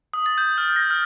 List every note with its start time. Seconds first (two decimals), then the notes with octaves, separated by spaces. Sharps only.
0.14 D#6
0.26 A6
0.38 G6
0.58 F6
0.76 A#6
0.91 F6